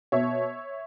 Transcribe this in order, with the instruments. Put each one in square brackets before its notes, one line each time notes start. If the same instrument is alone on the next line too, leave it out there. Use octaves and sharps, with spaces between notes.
[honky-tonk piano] B2 C#5 E5